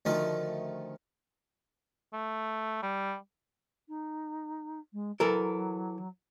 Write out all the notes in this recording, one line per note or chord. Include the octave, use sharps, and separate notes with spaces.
D2 D#3 F3 A3 D#4 A#4
A3
G3
D#4
G#3
E3 F#3 A4 A#4